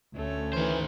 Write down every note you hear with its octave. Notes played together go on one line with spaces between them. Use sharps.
D2 A3 C#4 C#5
D#3 E3 C5